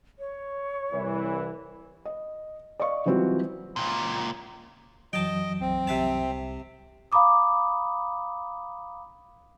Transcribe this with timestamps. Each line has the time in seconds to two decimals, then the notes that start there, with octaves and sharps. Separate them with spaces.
0.19 C#5
0.92 C2 E3
2.05 D#5
2.80 D5 D#5 F5 C#6
3.06 E3 F#3 G3 C4 F4 F#4
3.76 C#2 A#2
5.13 F#2 E3 F#3 D#5 G5 A5
5.60 B1 C4
5.87 C2 C3 E5 A5
7.12 F5 A#5 B5 D6 D#6